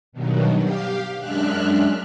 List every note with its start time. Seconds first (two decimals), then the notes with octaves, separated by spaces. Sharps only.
0.12 G2 B2 D#3 F#3
0.60 G4 F5
1.18 F#2 G#3 D4 E5 F6 F#6